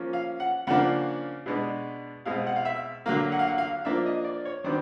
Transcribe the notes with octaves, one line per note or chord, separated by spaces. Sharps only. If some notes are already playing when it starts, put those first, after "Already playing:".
Already playing: F3 A#3 C#4
F5
F#5
C#3 F3 A#3 D4 F#5
B2 G#3 B3 D4
B2 G#3 C4 F5
F#5
F5
E5
D3 F#3 A#3 F5
F#5
F5
F#5
F5
F3 A#3 D4 E5
D#5
D5
C#5
D#3 F#3 B3 D4 C5